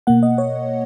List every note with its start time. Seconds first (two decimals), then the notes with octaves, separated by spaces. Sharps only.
0.07 B2 A#3 F#5
0.23 D#5
0.38 C#5